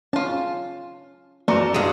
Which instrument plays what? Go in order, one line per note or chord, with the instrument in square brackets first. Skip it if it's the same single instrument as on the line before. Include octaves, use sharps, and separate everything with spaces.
[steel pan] C#4 [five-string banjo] F4 A5
[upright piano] F#2 C#7 [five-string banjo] E3 A3 A4 [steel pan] D5 A#5
[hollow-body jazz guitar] G2 G#3